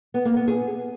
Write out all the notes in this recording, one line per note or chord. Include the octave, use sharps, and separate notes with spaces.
B3
A#3
B3
G#4